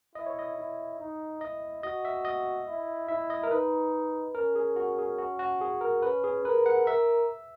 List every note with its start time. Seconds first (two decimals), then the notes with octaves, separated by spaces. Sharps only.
0.15 E4 D#5
0.26 C#5
0.39 D#5
0.57 E4
1.00 D#4
1.41 E4 D#5
1.83 F#4 D#5
2.05 E5
2.25 D#5
2.68 E4
3.08 E4 E5
3.30 D#5
3.43 A#4
3.51 D#4 B4
4.35 C#4 A#4
4.56 G#4
4.76 F#4
4.98 G#4
5.18 F#4
5.39 F#4
5.61 G#4
5.81 A#4
6.02 C#4 B4
6.24 G#4
6.45 A#4 B4
6.66 F#5
6.87 A#4 E5